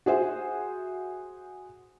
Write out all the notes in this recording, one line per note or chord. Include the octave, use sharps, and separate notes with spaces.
F#4 G#4 C5 E5